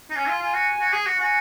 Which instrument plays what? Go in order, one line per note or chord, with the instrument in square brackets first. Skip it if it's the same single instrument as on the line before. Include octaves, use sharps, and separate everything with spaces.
[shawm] D#4
[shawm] C#4 [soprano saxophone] G#5
[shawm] F4
[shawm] F4 [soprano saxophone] G#5
[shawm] F#4
F#4
G#4
F#4
[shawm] F#4 [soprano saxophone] G#5